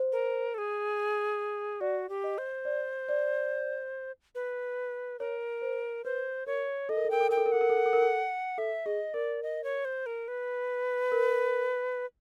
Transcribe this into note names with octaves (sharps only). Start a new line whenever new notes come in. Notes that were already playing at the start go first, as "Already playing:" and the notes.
Already playing: C5
A#4
A4
G#4
F#4 D5
G4
D#5
C5
D5
D5
B4
A#4 C#5
C5
B4 C5
A#4 C#5
A4 D#5
A#4
A4
A#4 G5
A4
A#4 G5
A4
A#4
A4 F#5
A#4
A4
A#4
A4
A#4
A4
A4 E5
G#4 D#5
A#4 D5
D#5
C#5
C5
A#4
B4
A#4